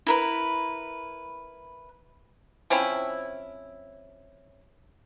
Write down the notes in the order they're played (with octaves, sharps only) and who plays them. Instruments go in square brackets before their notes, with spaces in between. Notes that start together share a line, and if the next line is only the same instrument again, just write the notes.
[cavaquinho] E4 A#4 B4
[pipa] F3 C4 C#4 E4